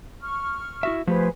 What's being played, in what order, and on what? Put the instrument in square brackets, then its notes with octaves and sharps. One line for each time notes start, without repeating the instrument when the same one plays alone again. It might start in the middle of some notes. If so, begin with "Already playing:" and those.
[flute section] C#6 F6
[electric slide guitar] E4 F#4 E5
[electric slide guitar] F3 A3 G4 [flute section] G#4 B4 C5